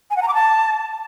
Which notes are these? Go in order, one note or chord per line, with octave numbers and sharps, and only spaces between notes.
G#5
F#5
A#5
D6
A5